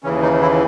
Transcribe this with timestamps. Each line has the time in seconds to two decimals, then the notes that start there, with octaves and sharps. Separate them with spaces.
0.03 D#2 C#3 E3 C#4
0.22 D#4
0.41 E4